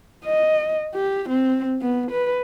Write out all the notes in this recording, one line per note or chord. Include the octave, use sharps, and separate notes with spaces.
D#5
G4
C4
B3
B4